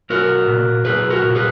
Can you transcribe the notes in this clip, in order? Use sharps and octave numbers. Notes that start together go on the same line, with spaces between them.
B1 F#4 A#4
A#2
B1 G#4 B4
F#4 A#4
A#2
G#4 B4